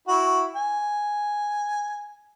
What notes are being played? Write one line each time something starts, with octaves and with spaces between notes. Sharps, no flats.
E4 F#4
G#5